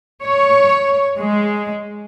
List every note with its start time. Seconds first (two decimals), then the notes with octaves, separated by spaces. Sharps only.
0.23 C#5
1.17 G#3